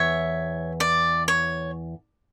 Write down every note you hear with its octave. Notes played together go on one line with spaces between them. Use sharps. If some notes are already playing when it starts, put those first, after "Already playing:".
Already playing: E2 E3 C#5 E5
D5
C#5